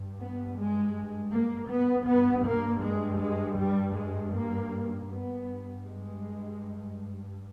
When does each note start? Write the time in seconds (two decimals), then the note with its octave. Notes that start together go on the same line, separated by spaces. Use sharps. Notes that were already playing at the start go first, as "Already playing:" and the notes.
Already playing: G2
0.20 B3
0.57 G#3
1.32 A#3
1.70 B3
2.07 G2 B3
2.46 A#3
2.83 G#3
3.21 G#3
3.58 G3
3.96 G#3
4.34 A#3
5.10 G2 B3
5.84 G#3